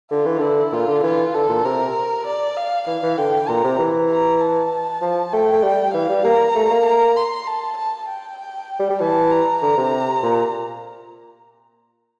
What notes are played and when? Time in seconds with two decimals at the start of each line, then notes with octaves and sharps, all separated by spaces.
0.11 D3 F4
0.26 E3
0.39 D3 E4
0.72 A#2 F4
0.88 D3
1.03 E3 F4
1.34 D3 A4
1.49 A#2
1.65 C3 A#4
2.27 D5
2.57 F5
2.87 E3 F5
3.03 E3
3.18 D3 G5
3.48 A#2 A#5
3.64 C3
3.79 E3
4.10 A#5
4.41 A5
5.02 F3
5.33 A3 G5
5.53 A3
5.64 G3
5.94 E3 F5
6.09 G3
6.25 A#3 A#5
6.55 A3
6.71 A#3
6.86 A#5
7.16 C6
7.47 A5
7.77 A5
8.09 G5
8.80 G3
8.90 G3
9.01 E3 A5
9.32 A#5
9.62 D3 A#5
9.77 C3
10.23 A#2